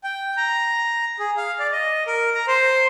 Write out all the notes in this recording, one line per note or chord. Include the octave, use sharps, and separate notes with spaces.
G5
A#5
G#4
F5
D5
D#5
A#4
A#5
C5